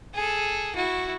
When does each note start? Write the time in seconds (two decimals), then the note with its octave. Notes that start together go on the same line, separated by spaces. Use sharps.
0.14 G#4 A4
0.75 E4 F#4